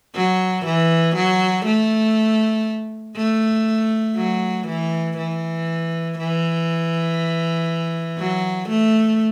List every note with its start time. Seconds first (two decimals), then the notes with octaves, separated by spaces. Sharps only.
0.15 F#3
0.65 E3
1.16 F#3
1.65 A3
3.16 A3
4.16 F#3
4.67 E3
5.17 E3
6.18 E3
8.18 F#3
8.69 A3